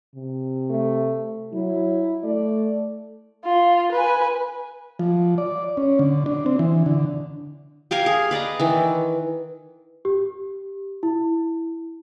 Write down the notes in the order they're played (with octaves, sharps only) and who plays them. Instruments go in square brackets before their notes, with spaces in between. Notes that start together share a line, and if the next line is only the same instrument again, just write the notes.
[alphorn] C3
[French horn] A3
[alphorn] F#3 [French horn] E4
[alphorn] A3 [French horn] D5
[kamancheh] F4
B4 G#5
[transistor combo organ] F3
D5
C#4
D3
D4
C4
E3
D3
[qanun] G4 A#4 F5 G#5
G#4
B4 D5 D#5 A#5
D#3 E3
[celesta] G4
E4